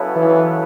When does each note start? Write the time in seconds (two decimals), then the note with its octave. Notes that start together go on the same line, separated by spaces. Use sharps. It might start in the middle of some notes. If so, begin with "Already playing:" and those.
Already playing: C#3 F#3 B3 E4 A4
0.16 E3